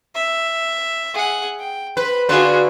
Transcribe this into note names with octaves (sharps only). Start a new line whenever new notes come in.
E5
G#4 F#5
G5
B4 C5 B5
D3 F4 F#4 G#4 B4